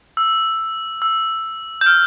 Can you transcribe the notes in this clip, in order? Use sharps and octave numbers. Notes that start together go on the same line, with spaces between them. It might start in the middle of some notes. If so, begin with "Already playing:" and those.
E6
E6
G6
F6